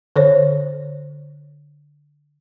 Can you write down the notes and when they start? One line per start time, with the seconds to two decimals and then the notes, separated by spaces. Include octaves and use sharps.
0.16 D3 A4 C5 C#5